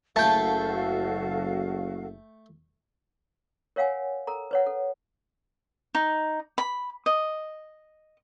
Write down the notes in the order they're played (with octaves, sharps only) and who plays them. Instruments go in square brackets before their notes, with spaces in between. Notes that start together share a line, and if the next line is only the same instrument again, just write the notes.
[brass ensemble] F#1 [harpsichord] A3 G5 [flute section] F#4 A4 F5 [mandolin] A5
[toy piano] A#4 C#5 F5 F#5 G#5
A4 A#4 A#5
B4 C#5 F#5
A4
[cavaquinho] D#4
B5
D#5